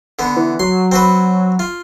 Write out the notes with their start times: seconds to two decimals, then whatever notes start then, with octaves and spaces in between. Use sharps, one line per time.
0.19 D3 B3
0.36 E3
0.60 F#3 C6
0.92 C4 F#4 B4
1.59 F4